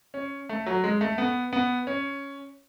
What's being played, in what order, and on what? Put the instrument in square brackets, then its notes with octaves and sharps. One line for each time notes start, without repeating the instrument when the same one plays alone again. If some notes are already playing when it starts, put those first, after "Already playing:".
[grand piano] C#4
A3
F#3
G#3
A3
B3
B3
C#4